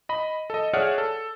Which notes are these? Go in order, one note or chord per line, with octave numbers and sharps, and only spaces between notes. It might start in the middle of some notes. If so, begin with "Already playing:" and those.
D#5 B5
A4 D#5
G#4 C#5 D5 E5 F#5 F6
A4